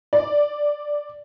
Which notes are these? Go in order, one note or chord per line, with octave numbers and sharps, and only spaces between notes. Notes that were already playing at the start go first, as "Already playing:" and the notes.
D5